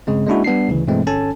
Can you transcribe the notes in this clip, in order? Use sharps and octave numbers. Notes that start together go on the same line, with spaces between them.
G2 C#3 G#3 C4
G#3 A#3 C#4 D4 E4 F#4
G3 B3 D4 C7
D2 C#3 E3
G2 B2 E3 G#3 A3 C4
G1 C#4 A4 G#5 A5